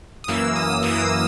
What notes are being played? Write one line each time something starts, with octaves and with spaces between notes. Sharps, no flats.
D#6
F#2 E3 A#3 E6
D#6
D#6
F#2 E3 A#3 E6
D#6